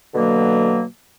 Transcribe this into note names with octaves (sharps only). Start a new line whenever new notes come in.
B2 D3 F#3 A#3